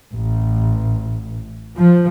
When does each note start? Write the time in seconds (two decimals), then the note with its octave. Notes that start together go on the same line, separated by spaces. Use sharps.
0.13 A1
1.75 F3